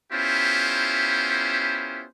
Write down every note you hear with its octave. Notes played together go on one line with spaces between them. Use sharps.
B3 C#4 E4 F4 G4 C5